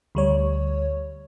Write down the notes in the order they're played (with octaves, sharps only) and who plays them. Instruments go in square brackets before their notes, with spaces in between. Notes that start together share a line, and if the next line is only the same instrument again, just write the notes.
[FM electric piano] D2 G3 C#5